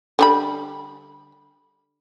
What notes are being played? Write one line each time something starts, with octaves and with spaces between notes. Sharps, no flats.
D3 G3 B5